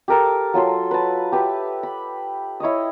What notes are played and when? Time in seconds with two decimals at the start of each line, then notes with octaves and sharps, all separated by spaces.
0.08 G4 A4 A#4 A5
0.54 F#3 F4 A4 C6
0.91 B4 A5
1.32 G4 B4 E5
1.83 B5
2.60 E4 C#5 D#5 D#6